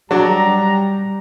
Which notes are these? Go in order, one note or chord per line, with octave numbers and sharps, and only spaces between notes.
F#3 G3 D4 A#5